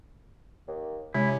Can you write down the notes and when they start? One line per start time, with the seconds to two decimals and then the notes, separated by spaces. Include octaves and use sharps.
0.68 D#2
1.14 C3 G#3 C#4 E4